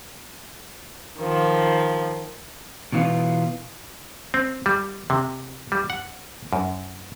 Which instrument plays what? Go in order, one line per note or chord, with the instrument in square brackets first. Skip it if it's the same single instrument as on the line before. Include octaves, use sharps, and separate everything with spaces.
[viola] D#3 F3
[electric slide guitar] B2 E3 C4 F4 B4 C#5
[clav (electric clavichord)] C4
G3
C3
G3
F#5
F#2